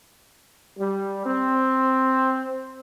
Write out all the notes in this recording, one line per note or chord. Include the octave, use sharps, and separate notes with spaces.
G3
C4